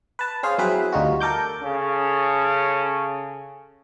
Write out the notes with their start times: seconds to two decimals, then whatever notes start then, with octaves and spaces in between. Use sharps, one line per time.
0.19 B4 A5
0.43 C#4 G#4 C5 F5
0.58 F#3 C4 E4 G#4 B4
0.92 D2 G3 D#4 F4 F#4
1.20 A4 A#4 D6 G6
1.62 C#3 C#4 G#4 A4